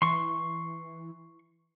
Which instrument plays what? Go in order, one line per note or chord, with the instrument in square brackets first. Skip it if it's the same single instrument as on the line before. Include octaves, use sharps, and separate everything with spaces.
[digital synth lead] E3 [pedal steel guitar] C6 C#6